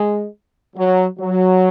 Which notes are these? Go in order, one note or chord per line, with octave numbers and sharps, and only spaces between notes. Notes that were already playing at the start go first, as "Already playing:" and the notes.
Already playing: G#3
F#3
F#3